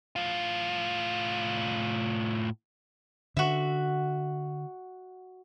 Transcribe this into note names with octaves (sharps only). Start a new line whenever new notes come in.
A2 F4
D3 F#4 E5